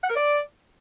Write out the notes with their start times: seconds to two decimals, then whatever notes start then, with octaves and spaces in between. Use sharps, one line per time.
0.04 F#5
0.10 A#4
0.16 D5